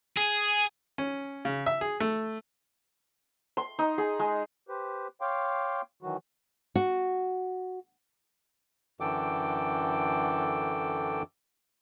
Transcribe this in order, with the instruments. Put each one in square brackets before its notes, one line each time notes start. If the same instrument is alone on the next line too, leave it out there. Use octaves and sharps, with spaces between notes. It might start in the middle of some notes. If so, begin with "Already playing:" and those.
[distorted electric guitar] G#4
[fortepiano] C#4
C#3
E5
G#4
A3
[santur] C6
D#4
G#4
G#3
[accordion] G4 B4 C5
C#5 F5 G5 C6 D6
D#3 E3 F#3 F#4
[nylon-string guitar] F#4
[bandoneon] F#2 D3 E3 A4 G5 D6